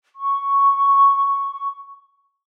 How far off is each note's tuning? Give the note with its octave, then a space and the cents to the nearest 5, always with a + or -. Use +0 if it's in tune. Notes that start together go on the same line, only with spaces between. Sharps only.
C#6 +0